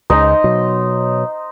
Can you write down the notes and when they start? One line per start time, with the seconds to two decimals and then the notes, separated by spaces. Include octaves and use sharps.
0.10 C#2 C#3 D#4 C5 D#5
0.44 B2 F#3